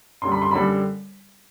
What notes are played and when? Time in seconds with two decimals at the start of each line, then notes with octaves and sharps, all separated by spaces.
0.22 F#2 D3 G3 C6
0.32 B5
0.42 C6
0.51 F#2 D3 G3 B5